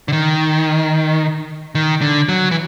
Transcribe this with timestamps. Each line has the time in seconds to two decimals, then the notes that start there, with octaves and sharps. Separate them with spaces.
0.08 D3
0.12 D#3
1.75 D#3
2.01 D3
2.29 F#3
2.51 E3